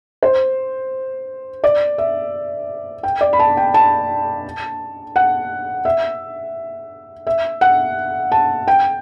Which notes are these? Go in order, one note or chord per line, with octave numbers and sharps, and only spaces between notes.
C5
D5
E5
G5
D5
B5
A5
G5
A5
F#5
E5
E5
F#5
A5
G5